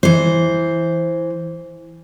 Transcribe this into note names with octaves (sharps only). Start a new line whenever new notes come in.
E3 C5